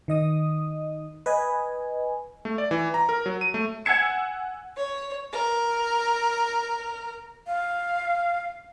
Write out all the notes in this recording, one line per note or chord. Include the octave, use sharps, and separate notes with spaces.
D#3 D#5 D#6
B4 D#5 G#5
A3
D5
E3
A#5
A#4
F#3
D#7
A3
F#5 G#5 E6 G#6 C#7 E7
C#5
A#4
F5